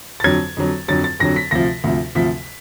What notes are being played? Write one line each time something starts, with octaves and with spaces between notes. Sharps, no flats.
A6
F2 D3 F#3 G#6
F2 D3 F#3
F2 D3 F#3 A6
A6
F2 D3 F#3 A#6
B6
D2 C3 F3 A#6
D2 C3 F3
D2 C3 F3 B6